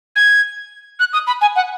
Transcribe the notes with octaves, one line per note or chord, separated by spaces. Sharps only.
G#6
F#6
D#6
B5
G#5
F#5